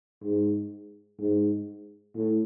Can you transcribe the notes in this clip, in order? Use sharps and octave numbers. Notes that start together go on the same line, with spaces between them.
G#2
G#2
A2